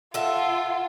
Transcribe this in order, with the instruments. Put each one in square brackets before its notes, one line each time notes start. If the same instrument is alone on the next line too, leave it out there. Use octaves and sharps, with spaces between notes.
[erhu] F4 [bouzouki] A4 E5 [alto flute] F#5